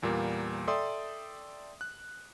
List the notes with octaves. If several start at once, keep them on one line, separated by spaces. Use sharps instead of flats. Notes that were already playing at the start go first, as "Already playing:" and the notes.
E2 A#2 G3 A#3
A4 D5 E5 G5 C6 D#6
F#6